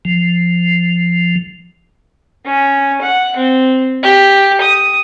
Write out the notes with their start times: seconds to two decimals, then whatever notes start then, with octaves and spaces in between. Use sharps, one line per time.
0.05 F3
2.45 C#4
3.02 F#5
3.36 C4
4.03 G4
4.61 D#6